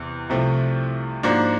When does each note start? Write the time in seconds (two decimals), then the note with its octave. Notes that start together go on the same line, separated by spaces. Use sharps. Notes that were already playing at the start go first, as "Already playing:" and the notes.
Already playing: E2 C3
0.29 C2 C3 F3 A3
1.23 G#2 F3 A#3 D4 F#4